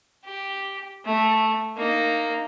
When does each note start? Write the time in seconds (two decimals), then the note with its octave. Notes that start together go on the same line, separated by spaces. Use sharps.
0.24 G4
1.05 A3
1.77 A#3 D#4